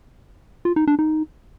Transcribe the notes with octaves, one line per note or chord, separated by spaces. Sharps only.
F4
D#4
D4
D#4